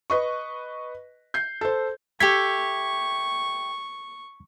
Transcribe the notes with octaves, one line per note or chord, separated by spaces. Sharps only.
B4 D#5 C#6
G6 C7
A4 C5
G4 A4 E5 C#6 G#6 B6